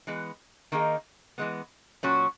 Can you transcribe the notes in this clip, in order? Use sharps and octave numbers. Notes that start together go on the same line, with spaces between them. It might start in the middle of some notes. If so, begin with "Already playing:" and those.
E3 G#3 B3
D#3 A#3 D#4 G#4
E3 G#3 B3
A#2 F#3 C#4 F#4